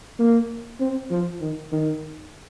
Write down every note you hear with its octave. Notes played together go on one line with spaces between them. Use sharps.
A#3
C4
F3
D#3
D#3